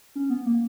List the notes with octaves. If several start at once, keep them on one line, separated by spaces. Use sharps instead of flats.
C#4
B3
A#3